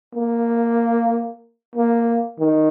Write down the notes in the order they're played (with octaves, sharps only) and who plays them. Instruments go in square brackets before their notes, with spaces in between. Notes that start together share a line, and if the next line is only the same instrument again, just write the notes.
[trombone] A#3
A#3
D#3